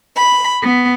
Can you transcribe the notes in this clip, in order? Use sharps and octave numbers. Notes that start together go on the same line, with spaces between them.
B5
B3